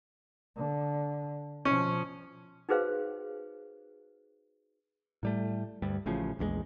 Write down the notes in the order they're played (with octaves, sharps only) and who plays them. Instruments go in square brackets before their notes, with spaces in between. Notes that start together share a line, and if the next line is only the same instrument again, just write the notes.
[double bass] D3
[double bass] B2 F3 [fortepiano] C#4
[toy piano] D#4 F#4 G#4 B4 C5 F5
[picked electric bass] A2 G3 A3
D2 G2 G3
A1 A2 C#3 F3
A#1 E2 D3 G#3